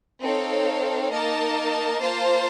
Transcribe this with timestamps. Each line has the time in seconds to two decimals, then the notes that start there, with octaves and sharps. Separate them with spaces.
0.22 C4 D#4 A4 C#5 F5
1.11 A#3 D#4 A#4 D#5 A5
2.01 A#3 F4 C5 F5 A5